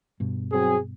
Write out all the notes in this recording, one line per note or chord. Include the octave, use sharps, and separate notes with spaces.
G2 B2
F#3 C4 G#4